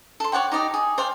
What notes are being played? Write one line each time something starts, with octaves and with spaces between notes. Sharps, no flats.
A4 C6
C#5 D5 F#5 G5
D#4 G4 D5 D#5
G#4
C5 D5 F5 G5